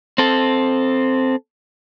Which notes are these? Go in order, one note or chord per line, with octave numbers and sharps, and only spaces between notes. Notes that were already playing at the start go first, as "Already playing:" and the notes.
C4 A4